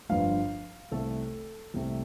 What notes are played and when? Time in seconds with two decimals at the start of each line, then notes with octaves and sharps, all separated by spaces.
0.09 G1 G2 F3 F5
0.92 C2 C3 A3 A4
1.74 C2 C3 A3